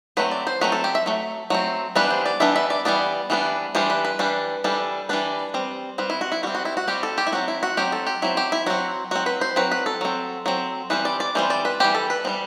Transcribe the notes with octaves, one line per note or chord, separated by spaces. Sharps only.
F#3 A3 C4 B4
D5
C5
F#3 A3 C4 B4
A4
G4
E5
F#3 A3
F#3 A3 C4
E3 G3 B3 D4 B4
C5
D5
E3 G3 B3 D4 E5
E5
D5
E3 G3 B3 D4 D5
E3 G3 B3 D4
E3 G3 D4 C5
B4
B4
E3 G3 D4
E3 G3 D4 A4
E3 G3 D4 B4
G3 C4
G3 C4 B4
E4
F#4
E4
G3 C4 F#4
F#4
E4
F#4
G3 C4 G4
A4
G4
E4
F#3 C4 F#4
E4
F#4
F#3 C4 G4
A4
G4
F#3 C4 E4
G4
E4
F#3 C4 F#4
F#3 C4 F#4
B4
C5
F#3 C4 B4
B4
A4
F#3 C4
F#3 C4
E3 G3 C4 B4
D5
D5
E3 G3 C4 C5
D5
B4
E3 G3 C4 G4
A4
B4
E3 G3 C4